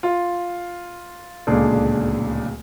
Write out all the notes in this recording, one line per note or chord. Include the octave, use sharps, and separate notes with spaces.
F4
D1 C#2 A#2 D4 G#4 A4